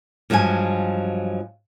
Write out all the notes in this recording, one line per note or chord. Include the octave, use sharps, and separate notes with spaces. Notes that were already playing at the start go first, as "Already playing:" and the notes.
G2 F3 F#3 G#3 G#5